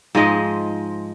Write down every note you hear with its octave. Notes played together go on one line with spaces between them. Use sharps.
G#2 F3 G#3 D#5